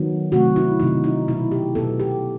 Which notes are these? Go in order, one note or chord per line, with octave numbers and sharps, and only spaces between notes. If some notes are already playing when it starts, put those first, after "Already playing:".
Already playing: D#3 F#3 B3
C3 D#3 F#3 A3 F#4
E4
C3 D#3 F#3 A3 D#4
D#4
B2 F#3 B3 E4
G4
B2 F#3 B3 A4
G4